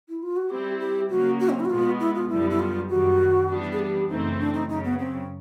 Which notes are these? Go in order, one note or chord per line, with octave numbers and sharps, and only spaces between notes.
E4
F4
F#4
G3 C4 E4 G4
G4
C#3 F#3 A#3 F#4
F#4
C4
E4
F#4
B2 G#3 B3 F4
E4
F4
F#2 D3 G3 B3 E4
E4
F4
F#2 D#3 G3 F#4
E3 G3 B3 D4
G#4
G4
F#2 C#3 E3 A3 C4 D#4
D4
D#4
F#2 C#3 F#3 D#4
B3
C4